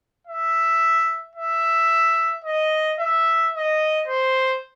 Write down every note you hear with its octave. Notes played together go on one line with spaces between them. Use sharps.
E5
E5
D#5
E5
D#5
C5